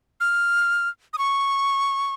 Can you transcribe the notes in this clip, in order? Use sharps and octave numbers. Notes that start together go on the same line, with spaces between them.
F6
D#6
C#6